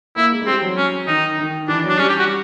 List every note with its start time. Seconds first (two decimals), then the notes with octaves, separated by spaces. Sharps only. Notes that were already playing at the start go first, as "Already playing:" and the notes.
0.16 A#3 E4
0.31 G#3
0.41 G#3
0.47 G3 C4
0.62 F#3
0.77 C#4
1.07 D#3 D#4
1.39 D#3
1.68 E3 D4
1.84 F#3
1.89 D4
1.98 G3 C#4
2.09 G4
2.19 F#4